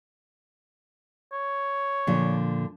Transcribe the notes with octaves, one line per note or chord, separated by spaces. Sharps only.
C#5
A#2 D3 F3